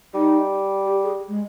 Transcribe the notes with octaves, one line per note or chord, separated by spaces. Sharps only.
G3 D#4
G4
G#4
G#3